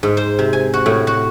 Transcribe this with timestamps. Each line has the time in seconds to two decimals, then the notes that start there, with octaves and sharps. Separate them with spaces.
0.03 G#2
0.17 C5
0.39 C3
0.53 G#5
0.74 F#4
0.86 A2
1.07 F#4